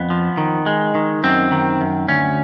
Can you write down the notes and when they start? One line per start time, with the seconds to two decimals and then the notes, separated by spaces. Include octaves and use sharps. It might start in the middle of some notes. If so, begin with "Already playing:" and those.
Already playing: F2 B3
0.10 F3
0.37 D#3
0.66 G#3
0.95 D#3
1.23 F#2 C4
1.52 D#3
1.81 F#2
2.08 D2 C#4